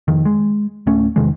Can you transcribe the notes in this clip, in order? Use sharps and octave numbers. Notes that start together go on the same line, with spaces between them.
F2 D#3
G#3
D1 A3 C#4
E2 C3 D#3 G#3